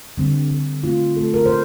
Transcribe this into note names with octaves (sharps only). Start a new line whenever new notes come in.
D3 G3 C4
D3 G3 C4
A#2 A3 C4 F4
A#2 A3 C4 A4
A#4
C5